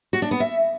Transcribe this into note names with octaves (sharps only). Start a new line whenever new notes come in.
F#4
D4
B3
E5